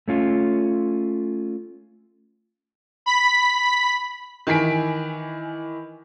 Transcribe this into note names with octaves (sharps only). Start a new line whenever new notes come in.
A3 C#4 F4
B5 B6
D#3 E3 G#5 B6 D7